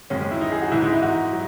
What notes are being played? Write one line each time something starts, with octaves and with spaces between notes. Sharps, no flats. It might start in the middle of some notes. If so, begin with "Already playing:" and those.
F#2 D#3 G#3 C#4
E4
D#4
G#4
F#4
G#2 E3 G#3 E4
D#4
E4
F#4
F#3